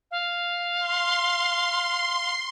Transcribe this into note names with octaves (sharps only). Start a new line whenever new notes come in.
F5
C6